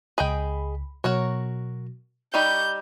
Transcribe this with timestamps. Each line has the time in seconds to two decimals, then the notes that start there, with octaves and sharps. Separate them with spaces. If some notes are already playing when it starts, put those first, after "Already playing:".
0.18 C#2 G#4 D#5 G5 B5
1.04 B2 F#3 F#4 A#4 C#5
2.34 G3 D#4 G4 D5 B5 C#6 G6